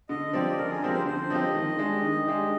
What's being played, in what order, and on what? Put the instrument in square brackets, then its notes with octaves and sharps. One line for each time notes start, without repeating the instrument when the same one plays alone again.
[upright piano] D3 [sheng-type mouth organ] D#5
[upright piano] F3 C4 G4 [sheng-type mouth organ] D5
[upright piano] D3 [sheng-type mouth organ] A#4
[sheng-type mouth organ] G#4
[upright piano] F3 C4 G4 [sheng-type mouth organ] A#4
[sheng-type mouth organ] C5
[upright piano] D3 [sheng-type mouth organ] C5
[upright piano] F3 C4 G4 [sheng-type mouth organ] D#5
[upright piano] D#3
G#3 D4 G4
D#3
G#3 D4 G4